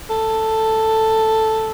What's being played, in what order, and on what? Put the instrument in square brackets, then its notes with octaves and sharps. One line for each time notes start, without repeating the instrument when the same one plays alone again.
[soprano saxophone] A4